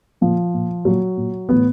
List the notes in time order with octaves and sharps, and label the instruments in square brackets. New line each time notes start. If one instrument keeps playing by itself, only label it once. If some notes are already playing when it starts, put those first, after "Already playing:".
[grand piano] A#2 F3
A#2
A#2 F#3
A#2
A2 E3 B3